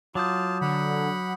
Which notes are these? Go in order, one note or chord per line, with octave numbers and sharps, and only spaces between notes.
F#3 F4 A5 D6 D#6 G6
D3 F#5 B5